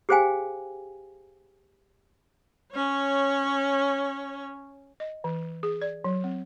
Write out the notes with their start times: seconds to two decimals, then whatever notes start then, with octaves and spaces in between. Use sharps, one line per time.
0.09 G4 G#4 C5 F5 G5 G#5
2.74 C#4 C#5
5.00 D#5
5.24 E3
5.63 G#4
5.82 D5
6.04 F#3
6.24 C4